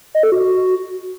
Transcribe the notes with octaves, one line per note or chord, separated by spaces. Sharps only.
D#5
A4
F#4